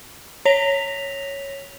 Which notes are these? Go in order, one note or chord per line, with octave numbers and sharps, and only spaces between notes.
C#5 A#6 B6 F7